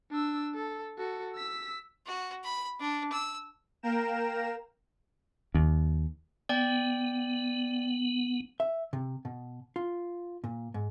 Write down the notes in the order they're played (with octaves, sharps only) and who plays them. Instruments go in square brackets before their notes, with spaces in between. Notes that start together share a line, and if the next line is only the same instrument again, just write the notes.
[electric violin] D4 E6
A4
F#4 A4
E6 B6
[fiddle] F#4
B5
D4
E6
[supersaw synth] A#3 A#4 G5 A#5 E7
[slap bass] D#2
[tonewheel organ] B3 [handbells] D5 G5
[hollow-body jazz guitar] E5
C3
B2
F4
A#2
G#2